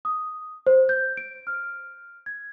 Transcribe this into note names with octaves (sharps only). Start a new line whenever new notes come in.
D#6
C5
G6
D7
F6
G#6